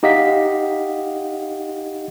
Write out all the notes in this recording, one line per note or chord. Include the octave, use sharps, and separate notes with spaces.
D#4 G4 D#5 F5 F#5 B6